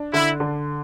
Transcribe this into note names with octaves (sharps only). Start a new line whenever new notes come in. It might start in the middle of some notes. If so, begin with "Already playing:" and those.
Already playing: D4
D3 E4
D3